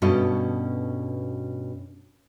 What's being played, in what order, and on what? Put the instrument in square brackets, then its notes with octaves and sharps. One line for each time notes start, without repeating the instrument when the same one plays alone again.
[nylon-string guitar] G2 B2 C#4 F#4 A4 D#5